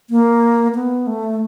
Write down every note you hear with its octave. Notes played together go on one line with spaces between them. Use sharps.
A#3
B3
A3